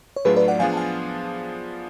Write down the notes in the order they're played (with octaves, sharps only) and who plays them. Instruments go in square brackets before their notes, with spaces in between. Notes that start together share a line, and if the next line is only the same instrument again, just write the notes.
[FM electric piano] C#5
[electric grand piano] A2 F#3 A3 D4 F4 [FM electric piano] G#4 B4
[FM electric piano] B4 D5
D5 F#5
[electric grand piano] F3 B3 D4 F4 G#4 [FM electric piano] F5 G#5
[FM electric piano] A5
F5 G#5